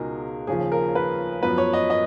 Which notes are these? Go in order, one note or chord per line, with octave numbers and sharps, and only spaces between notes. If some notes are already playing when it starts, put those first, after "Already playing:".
Already playing: C#2 B2 G#3 D#4 G#4 A#4
D#2 C#3 F3 G#4
A#4
B4
F#2 F3 B3 B4
C#5
D#5
D#5